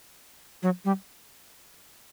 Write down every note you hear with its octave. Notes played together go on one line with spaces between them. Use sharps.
F#3
G3